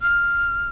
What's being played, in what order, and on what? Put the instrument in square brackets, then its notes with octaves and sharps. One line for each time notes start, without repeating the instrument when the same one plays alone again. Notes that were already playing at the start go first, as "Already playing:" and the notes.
[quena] F6